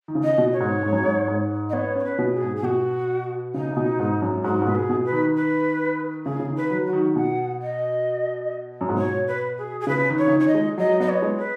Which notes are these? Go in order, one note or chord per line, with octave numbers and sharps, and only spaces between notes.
D#3
C#3
D#5
B2
C#5
G#2
G#2
F#2
G#2
G#2
D#5
B3 C#5
C#4 C#5
B4
B2
G#4
G#2
G#4
B2 F#4
C#3 D#4
C#3
B2
G#2
F#2
G#2 F#4
G#2
B2 B4
G#4
B2
B4
D#3
B4
C#3 G#4
C#3
D#3
B4
F#3
F#4
D#3
B2 F#5
D#5
F#2
G#2
B2 C#5
B4
G#4
G#4
C#3 B4
D#3
C#5
C#3
D#3
C#5
D#5
G#3
F#3 D#5
B3 D#5
C#5
G#3
B4